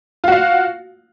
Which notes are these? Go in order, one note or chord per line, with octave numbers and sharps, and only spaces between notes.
F4 F#4 F5